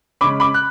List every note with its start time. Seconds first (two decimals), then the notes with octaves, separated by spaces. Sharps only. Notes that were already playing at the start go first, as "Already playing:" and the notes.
0.21 C#3 G#3 C#4 B5 D6
0.40 B5 D6
0.54 F#6